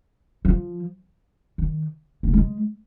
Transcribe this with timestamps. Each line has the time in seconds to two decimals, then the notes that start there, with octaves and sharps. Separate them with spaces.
0.45 F3
1.58 D#3
2.23 A#3
2.33 G#3